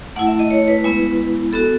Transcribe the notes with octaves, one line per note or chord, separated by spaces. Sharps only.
A3 E4 F#5
E5
D#5
C#5
B4
G#3 B3 E4
B3 F#4 A4